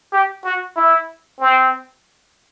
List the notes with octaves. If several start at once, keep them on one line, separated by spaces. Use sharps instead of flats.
G4
F#4
E4
C4